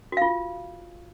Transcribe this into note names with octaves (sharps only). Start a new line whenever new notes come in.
F4 F#4 F5